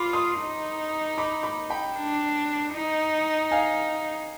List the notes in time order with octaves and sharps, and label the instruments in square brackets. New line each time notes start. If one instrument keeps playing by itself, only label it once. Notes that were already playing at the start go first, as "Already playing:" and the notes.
Already playing: [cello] F4 [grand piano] B5 C6 D6
[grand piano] C6 D#6
[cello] D#4
[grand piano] B5 D6
B5 D6
G5 B5
[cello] D4
D#4
[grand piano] F5 G#5